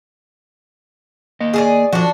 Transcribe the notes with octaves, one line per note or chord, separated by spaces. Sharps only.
A#3 D#5
G#4 A4 D5
F3 D4 F#4 A4